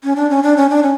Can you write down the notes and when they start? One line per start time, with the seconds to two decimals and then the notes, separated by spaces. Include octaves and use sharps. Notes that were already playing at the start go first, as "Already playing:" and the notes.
0.04 C#4
0.16 D4
0.30 C#4
0.43 D4
0.57 C#4
0.70 D4
0.83 C#4